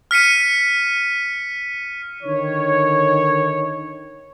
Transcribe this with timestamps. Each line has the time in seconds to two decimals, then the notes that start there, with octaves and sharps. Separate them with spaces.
0.11 F6 B6 C#7 D#7
2.23 D3 D#3 C#5